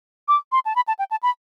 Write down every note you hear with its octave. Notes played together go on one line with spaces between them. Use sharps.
D6
C6
A5
B5
A5
G5
A5
B5